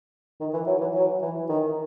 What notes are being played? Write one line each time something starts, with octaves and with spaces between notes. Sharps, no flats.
D#3
E3
F#3
E3
F#3
E3
D#3